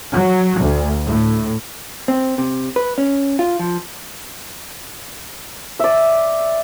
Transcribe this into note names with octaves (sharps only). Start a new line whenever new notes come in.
F#3
D2
A2
C4
C3
B4
C#4
F4
F3
D5 E5